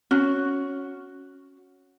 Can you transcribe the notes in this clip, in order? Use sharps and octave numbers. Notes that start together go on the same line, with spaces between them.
C#4 F#4